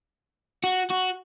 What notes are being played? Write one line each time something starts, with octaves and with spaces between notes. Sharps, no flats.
F#4
F#4